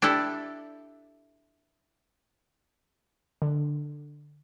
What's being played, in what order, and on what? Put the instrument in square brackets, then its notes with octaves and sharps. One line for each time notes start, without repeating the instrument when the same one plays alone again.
[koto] D4 E4 G4 A4 D5
[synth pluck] D3